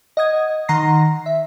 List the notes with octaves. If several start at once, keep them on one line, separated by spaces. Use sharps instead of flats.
D#5 F#5 D#6 G#6
D#3 F#5 A#5 C6 A#6 C7
E5